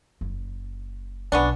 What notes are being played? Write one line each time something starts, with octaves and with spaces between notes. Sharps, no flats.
F#1
B1 F2 B3 C#4 D4